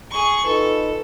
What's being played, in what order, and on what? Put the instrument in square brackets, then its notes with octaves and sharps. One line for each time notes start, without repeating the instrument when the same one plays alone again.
[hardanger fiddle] G#4 C#6
[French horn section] D#4 F4 B4 [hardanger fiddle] A4